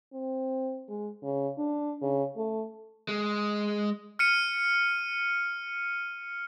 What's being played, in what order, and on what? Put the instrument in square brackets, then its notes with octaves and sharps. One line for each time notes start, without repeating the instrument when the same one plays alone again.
[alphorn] C4
G#3
C#3
D4
C#3
A3
[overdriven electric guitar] G#3
[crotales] F6 C#7 D#7